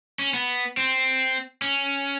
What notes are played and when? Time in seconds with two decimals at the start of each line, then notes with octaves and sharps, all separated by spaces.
0.19 C#4
0.34 B3
0.77 C4
1.62 C#4